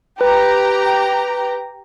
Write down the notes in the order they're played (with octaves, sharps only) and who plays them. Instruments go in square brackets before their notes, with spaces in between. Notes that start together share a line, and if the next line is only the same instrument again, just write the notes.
[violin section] G4 A#5 [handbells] B4